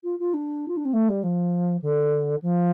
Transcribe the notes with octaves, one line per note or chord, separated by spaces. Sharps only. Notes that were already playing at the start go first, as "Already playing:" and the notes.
F4
F4
D4
F4
D4
C4
A3
G3
F3
D3
F3